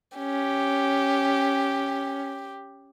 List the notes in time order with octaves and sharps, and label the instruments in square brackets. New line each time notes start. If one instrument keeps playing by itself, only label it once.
[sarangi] C#4 [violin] G4